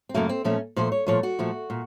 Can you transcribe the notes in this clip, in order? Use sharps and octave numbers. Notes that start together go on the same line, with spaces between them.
C4
F#2 C#3 F#3 A3 A#3
C4
A#2 F3 A3 C#4
A#2 F3 A3 C5
C#5
A#2 F3 A3 C#5
F#4
A#2 F3 A3
A#2